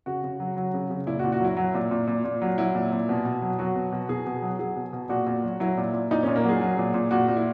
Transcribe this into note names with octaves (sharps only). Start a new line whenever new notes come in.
C#3 F#4
C#3
F#3
F#3
C#3
C#3
A#2 E4
F#4
A#2
F#4
F#3 E4
F#3
A#2
A#2
A#2
A#2
F#3
F#3 E4
A#2
A#2
B2
B2
F#3
F#3 F#4
B2
B2
B2 G#4
B2
F#3
F#3 G#4
B2
B2
A#2 F#4
A#2
F#3
F#3 E4
A#2
A#2
A#2 D#4
A#2 C#4
A#3
F#3
G#4
F#3
A#2
A#2
A#2 F#4
A#2
E4